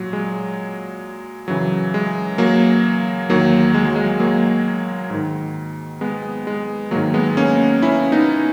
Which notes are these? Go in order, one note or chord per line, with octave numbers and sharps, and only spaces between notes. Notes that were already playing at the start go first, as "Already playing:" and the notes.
Already playing: A#2 F#3
G#3
F#2 C#3 E3 F#3
G#3
F#3 A#3
E2 D#3 F#3 A#3
G#3
F#3
G#3
F#3 A#3
G#2 D#3
G#3 B3
G#3
G#2 D#3 F#3 A#3
G#3 B3
A#3 C#4
C#4 E4
B3 D#4